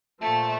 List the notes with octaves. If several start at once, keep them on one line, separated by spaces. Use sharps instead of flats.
A#2 F3 A3